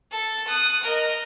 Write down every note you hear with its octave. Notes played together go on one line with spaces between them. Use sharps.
A4
D#6 F#6
A#4 D#5